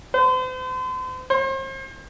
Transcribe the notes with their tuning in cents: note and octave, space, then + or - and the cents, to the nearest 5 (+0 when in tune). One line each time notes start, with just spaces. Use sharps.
C5 -40
C5 +40